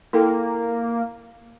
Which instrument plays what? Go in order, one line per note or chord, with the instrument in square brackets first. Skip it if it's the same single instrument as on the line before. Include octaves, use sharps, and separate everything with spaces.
[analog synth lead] A#3 [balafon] E4 A4 G5